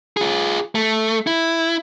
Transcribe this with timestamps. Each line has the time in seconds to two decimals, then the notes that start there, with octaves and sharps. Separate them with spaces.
0.17 F4 G#4
0.75 A3
1.27 E4